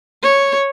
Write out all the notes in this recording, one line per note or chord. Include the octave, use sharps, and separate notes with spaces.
C#5